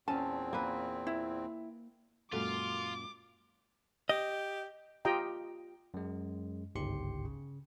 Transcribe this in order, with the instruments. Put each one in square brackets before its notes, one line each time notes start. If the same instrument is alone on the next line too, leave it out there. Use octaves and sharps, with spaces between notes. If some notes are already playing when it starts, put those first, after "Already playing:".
[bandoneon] E2 A#2 C4 [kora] C#4 F5 [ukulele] A5
[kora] A#3 B4
[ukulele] E4
[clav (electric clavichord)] F#2 A#2 [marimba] G#3 F#4 A4 [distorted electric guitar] F4 [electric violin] D6
[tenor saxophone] G4 [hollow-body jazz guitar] D#5
[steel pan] F4 G4 D#5 G5 A#5
[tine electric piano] F#2 G#3
G1 C#2 G#2 G4 C6 C#7
C#3